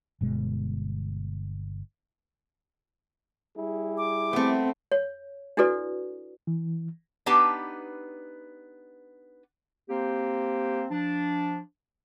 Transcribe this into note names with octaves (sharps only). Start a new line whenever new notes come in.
G1 B2 G#3
G3 E4 G#4
D6
A3 B3 C4
C#5
D4 E4 F#4 A4 B4 D5
E3
B3 D4 D#4 G4 B4 A5
A#3 C4 G4 C5
F3 D4